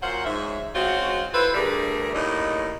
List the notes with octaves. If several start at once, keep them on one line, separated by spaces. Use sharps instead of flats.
A#2 F#3 F4 C5 F#5
G#2 C#5 E5
G#3 C4 C#4 F4 F#4
E4 F4 A4 B4 C5
D2 G2 G3 A3 G#4 A#4
D#2 A2 C#3 D#4 D5 D#5